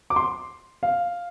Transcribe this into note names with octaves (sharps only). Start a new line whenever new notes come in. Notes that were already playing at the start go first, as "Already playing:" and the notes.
D6
C6
F5